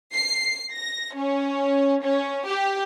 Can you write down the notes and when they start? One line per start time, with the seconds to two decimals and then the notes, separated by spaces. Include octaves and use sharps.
0.14 C7
0.72 A#6
1.14 C#4
2.02 C#4
2.46 G4